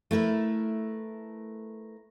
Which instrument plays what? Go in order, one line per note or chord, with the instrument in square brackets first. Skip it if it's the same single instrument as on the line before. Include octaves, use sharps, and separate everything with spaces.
[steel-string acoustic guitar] A3 E4 A#4 B4